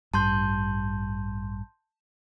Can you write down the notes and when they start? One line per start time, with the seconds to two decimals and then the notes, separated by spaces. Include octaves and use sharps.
0.14 A1 G2 A5 C6 G6